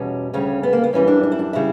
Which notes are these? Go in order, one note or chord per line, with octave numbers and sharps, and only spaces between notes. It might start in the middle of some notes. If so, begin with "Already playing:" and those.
Already playing: E2 B2 G3 C#4
D2 C#3 G3 C#4
B3
A#3
B3
F#2 E3 G3 C#4
D4
D4
E4
D4
C#3 G3 E4